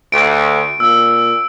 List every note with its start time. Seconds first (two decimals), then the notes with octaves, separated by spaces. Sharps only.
0.12 D2 D7
0.80 A#2 E6